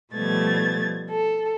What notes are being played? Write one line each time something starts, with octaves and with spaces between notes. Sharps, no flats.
B2 F3 G3 A3 G#6 A6
A4